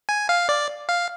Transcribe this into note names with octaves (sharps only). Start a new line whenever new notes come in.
G#5
F5
D5
F5